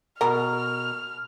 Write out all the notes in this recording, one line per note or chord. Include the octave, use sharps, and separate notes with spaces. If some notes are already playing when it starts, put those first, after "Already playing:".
B2 A#4 F6